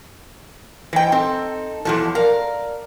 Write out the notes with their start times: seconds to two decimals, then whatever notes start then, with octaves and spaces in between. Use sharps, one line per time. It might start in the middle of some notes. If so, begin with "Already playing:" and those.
0.93 E3 D#4 C5 G5
1.12 C4 D#4 A4
1.85 E2 F3 F#3 E4 A4
2.15 A#4 D5 F5